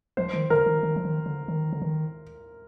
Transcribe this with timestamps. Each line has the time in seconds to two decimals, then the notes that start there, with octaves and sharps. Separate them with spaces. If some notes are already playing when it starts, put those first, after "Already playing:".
0.17 F3 C5
0.34 D#3
0.50 D3 A#4
0.66 D#3
0.83 D#3
0.96 F3
1.05 D#3
1.26 D3
1.48 D#3
1.73 D3
1.82 D#3